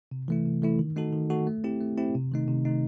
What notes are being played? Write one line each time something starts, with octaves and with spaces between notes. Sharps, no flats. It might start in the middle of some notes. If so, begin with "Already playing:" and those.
C3
E3 A3 E4
C3
E3 A3 E4
D#3
A3 D#4 F#4 A4
D#3
A3 D#4 F#4 A4
A3
C4 E4 G4
A3
C4 E4 G4
C3
D#3 A3 D#4
C3
D#3 A3 D#4